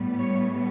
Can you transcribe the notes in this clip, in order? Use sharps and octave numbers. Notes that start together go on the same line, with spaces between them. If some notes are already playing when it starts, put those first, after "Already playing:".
Already playing: A2 G3 B3
C#5